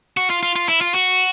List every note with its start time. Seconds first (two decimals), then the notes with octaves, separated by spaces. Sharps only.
0.17 F#4
0.30 F4
0.43 F4
0.56 F4
0.69 E4
0.81 F4
0.94 F#4